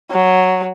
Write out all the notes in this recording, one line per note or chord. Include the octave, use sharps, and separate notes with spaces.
F#3